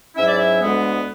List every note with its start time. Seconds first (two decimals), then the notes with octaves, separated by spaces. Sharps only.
0.15 G#2 F#3 C#4 E4 E5
0.26 D5
0.36 E5
0.60 D2 D3 G#3 B3